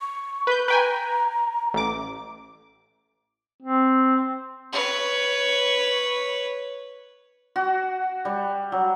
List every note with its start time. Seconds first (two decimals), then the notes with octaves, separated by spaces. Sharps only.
0.01 C#6
0.47 B4 G6
0.68 B4 G5 G#5 A#5
1.74 A1 D6
3.62 C4
4.72 B4 C#5
7.56 F#4
8.25 G3
8.72 F#3